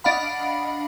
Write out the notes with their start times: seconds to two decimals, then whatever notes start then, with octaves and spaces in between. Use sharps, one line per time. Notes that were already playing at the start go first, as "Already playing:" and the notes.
0.04 D4 D#5 F5 F#5 B5